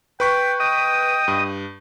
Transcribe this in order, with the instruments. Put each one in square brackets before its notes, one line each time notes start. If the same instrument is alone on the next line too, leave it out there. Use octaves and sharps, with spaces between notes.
[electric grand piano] B4 C#6 B6 [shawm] G5
[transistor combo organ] D#5 D#6 [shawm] G5
[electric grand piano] G2